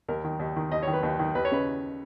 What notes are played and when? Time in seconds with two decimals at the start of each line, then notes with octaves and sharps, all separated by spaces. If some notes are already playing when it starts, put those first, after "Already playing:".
0.08 D#2 A#4
0.24 D#3
0.39 D#2
0.56 D#3
0.72 D#2 D#5
0.83 C#5
0.87 D#3
0.93 B4
1.03 D#2
1.19 D#3
1.35 D#2 B4
1.45 C#5
1.51 C#3 B4